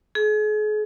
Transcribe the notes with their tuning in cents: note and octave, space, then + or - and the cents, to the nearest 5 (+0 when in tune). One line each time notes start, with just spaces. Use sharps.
G#4 +40